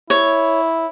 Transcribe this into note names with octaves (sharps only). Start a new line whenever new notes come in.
E4 C#5